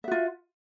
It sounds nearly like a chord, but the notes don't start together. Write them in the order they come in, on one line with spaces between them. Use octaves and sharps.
E5 F#4 F4